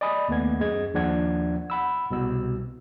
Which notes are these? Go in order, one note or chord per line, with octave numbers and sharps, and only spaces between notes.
D5 D#5 G#5 B5 D#6
D#2 A3 B3 G#6
F#2 G#4 D#5 G#6
D#2 F3 D4 D5 F#5 G#6
F#5 B5 E6
C2 B2 E6